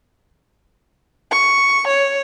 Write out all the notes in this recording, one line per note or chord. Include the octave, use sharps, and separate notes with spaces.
C#6
C#5